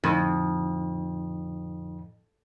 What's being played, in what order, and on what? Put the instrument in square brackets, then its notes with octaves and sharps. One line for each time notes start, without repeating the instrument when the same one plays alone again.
[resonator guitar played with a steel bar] F2 [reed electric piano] A2 D3 D#4